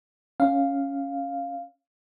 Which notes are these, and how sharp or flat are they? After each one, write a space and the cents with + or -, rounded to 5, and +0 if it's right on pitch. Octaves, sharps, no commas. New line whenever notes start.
C#4 +0 F5 +0